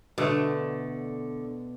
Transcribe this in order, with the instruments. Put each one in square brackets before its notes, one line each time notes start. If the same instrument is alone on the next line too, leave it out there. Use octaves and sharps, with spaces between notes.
[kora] B2 A3 [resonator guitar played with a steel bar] D3